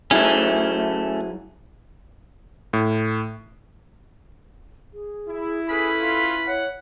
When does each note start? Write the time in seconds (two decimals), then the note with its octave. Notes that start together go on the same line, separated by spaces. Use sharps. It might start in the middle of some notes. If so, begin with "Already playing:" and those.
0.11 F#3 A3 C#4 E4 G#4
2.73 A2
4.93 G#4
5.28 E4
5.69 C#4 G#4 A4 B4 B5
6.01 F4
6.47 C#5 F#5